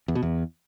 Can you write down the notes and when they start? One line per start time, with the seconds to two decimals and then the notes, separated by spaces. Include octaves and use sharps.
0.08 E2
0.15 B2
0.22 E2